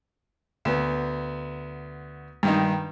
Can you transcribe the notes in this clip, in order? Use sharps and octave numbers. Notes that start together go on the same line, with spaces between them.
D2 B3
G2 D#3 D#4